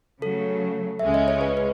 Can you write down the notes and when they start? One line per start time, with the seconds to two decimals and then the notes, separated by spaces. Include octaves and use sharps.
0.22 C#3 F#3 A3 A4
0.99 C#2 C#3 G#3 C#4 E5
1.14 D#5
1.28 C#5
1.41 B4
1.57 B4